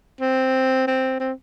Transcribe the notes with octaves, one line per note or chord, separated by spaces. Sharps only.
C4
C4
C4